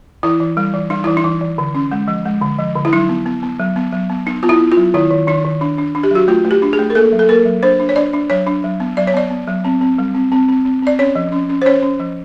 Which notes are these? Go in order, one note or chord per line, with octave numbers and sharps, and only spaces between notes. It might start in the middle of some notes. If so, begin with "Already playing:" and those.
E3 E4
E3
G3
E3
G3 D#4
E3 E4
D#4
E3
E3
D3
C#4
G#3
F3
G#3
D3
F3
D3
E4
F#3 D#4
B3
B3
B3
F#3
B3
F#3
B3
B3 D#4
B3 F4
E4
B3
F4
F#3
D#3 E4
D#3
D#3 D#4
D#3
D4
D4
D4
G4
F#3 F#4
A3 F4
A3
G4
D4
G#4
A3
A#4
A#3 A4
F#3
A4
A#3 A#4
F#3
D4 C5
D4
C#5
D4 D5
D4
F#3 C#5
D4
F#3
B3
F#3 D5
C#5
B3 D5
B3
F#3
C4
C4
G3
C4
C4
C4
C4
C4 D5
C#4 C#5
F3
C#4
C#4
C5
C#4 C#5
C#4
F3